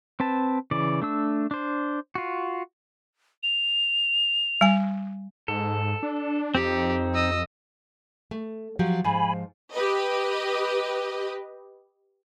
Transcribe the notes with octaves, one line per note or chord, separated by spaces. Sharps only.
C4 B4 A5
C#3 E3 D5
A3 D4 E6
D4 C5
F4 F#4
F7
G3 G#5
G#2 A4
D4
F2 C4 D#4 G4
D#5 E6
A3
F3 F#3 G4
G#2 F3 G#5 B5
G4 B4 D#5